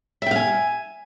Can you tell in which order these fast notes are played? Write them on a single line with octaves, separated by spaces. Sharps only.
E5 G5 F5 G#5